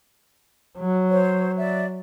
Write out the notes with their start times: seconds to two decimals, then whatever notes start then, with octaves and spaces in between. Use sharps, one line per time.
0.78 F#3
1.10 C5 C#5
1.58 D5 E5